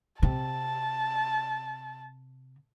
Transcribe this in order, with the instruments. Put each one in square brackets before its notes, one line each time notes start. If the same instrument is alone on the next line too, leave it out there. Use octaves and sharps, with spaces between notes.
[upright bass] C3 [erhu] A5